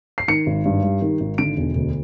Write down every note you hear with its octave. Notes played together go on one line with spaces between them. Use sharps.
C7
D#3 C#7
G#1
G2
G3
D#3
G#1
D3 D7
E1
D2